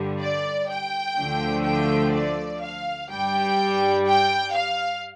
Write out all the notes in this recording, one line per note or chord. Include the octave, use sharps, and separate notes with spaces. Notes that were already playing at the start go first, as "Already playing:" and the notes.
Already playing: G2 D3 G3
D5
G5
D2 D3 F3 A3
G5
D5
F5
G2 G3 G5
G5
F5